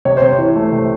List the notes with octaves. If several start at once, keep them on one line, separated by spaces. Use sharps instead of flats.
C3 C#5
C3 C5
C#5
E3
A3
C3